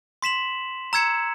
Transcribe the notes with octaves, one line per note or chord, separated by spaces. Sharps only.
C6 B6 E7 F#7
A#5 E6 G#6 C#7 E7